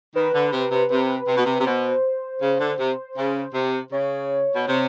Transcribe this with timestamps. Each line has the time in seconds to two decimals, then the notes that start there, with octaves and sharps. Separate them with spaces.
0.15 D#3 B4
0.34 D3
0.53 C3
0.71 C3
0.90 C3 B4
1.28 C3
1.37 B2
1.46 C3
1.61 C3
1.67 B2 C5
2.42 C#3
2.60 D3
2.79 C3
3.17 C#3
3.54 C3
3.92 C#3 C#5
4.56 B2
4.68 C3